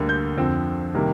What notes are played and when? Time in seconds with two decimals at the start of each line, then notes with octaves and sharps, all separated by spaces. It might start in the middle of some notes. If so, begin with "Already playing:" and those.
Already playing: D2 D3 G3 A#3
0.09 G6
0.37 F2 D3 F3 C4
0.95 C3 D#3 G3 A#3